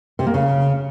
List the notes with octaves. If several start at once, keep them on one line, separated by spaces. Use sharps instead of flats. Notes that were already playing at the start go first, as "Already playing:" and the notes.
C3
A#3
C#3